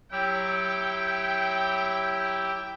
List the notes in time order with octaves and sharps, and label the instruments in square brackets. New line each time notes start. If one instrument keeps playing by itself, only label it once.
[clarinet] F#3 [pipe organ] E4 G4 [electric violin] G5